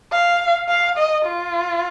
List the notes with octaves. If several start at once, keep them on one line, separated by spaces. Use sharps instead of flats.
F5
F5
D#5
F4